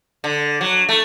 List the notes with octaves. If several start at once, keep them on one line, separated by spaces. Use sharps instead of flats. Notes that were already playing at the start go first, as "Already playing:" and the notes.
D3
F#3
A3